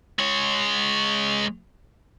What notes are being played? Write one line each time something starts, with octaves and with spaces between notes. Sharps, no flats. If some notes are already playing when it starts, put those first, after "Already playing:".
G#3 C#5